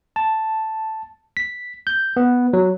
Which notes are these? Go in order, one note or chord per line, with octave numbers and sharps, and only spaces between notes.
A5
B6
G6
B3
F#3